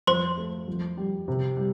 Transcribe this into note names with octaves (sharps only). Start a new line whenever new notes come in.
F2 C5 C6
A3
F2
G3
C3
G3